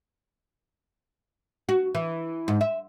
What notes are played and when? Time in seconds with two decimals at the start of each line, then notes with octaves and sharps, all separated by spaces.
1.69 F#4
1.95 E3
2.48 G#2
2.61 E5